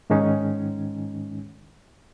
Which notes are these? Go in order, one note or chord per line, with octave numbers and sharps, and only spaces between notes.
G#2 D#3 G#3 C#4 D#4